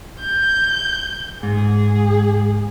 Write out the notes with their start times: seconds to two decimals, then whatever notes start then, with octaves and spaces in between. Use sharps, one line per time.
0.20 G6
1.43 G#2 G#4